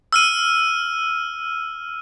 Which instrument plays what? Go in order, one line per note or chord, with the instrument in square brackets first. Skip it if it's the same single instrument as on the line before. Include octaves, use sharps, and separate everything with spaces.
[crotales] E6 F6 D#7